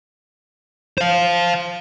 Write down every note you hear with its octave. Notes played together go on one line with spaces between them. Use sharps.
C5 F5